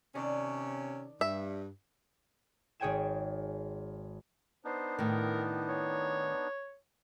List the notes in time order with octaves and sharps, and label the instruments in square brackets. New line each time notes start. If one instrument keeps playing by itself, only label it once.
[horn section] C3 C#4 [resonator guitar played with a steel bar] D#3 D4 D5
[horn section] G2 [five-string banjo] E5
[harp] G#1 G#4 C#5 G5 G#5 E7
[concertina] B3 D4 D#4 [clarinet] C5
[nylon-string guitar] A2 D#3 [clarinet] A#4
[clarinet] C#5